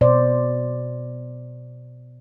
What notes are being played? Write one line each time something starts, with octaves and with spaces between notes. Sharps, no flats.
B2 C5 D5